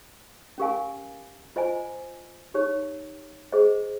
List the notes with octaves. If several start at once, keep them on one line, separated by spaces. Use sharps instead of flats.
C#4 G4 A#4 F5 G#5
F4 C5 D#5 G#5
D#4 G4 C#5
G#4 C5 D#5